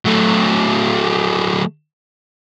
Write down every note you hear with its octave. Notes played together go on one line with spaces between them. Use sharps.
F#3 A3